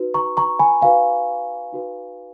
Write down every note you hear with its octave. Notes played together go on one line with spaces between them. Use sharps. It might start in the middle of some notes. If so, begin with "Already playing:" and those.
Already playing: D#4 F#4 B4
A#5 C#6
A#5 C#6
G#5 B5
D#4 F#4 B4 F5 G#5
D#4 F#4 B4